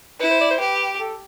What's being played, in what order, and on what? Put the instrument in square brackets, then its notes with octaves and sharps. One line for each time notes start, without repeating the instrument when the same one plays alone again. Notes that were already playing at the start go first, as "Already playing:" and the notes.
[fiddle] E4 [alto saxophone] B4
[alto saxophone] C5
D5
C5
[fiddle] G4 [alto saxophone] B4
[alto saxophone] A4